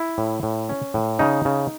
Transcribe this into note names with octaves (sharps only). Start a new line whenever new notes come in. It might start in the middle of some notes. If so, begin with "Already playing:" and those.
Already playing: E4
A2
A2
C#4
A2
C#3 D#4
C#3